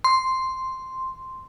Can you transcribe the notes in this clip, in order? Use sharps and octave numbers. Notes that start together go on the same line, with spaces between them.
C6